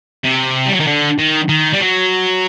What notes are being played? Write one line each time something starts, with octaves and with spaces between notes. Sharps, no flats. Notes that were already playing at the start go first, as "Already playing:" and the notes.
C3
G3
F#3
D#3
D3
D#3
D#3
G3
F#3